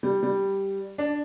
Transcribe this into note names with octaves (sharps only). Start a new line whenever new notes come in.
G3
G3
D4